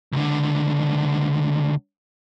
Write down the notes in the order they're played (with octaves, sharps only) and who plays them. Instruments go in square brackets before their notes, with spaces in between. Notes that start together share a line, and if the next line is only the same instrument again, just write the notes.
[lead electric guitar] C#2 D3